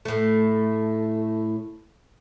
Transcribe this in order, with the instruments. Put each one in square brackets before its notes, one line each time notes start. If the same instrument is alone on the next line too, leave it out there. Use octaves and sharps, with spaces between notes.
[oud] A2 A3